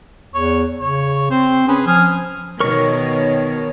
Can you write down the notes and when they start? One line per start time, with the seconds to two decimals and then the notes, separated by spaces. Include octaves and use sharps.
0.35 E2 C#5
0.81 C#3 C#5
1.31 C4 C5
1.68 C#4 G#4 B4
1.87 F3 G#5 D#6 F6
2.60 B2 D#3 A#4 C#5 C#6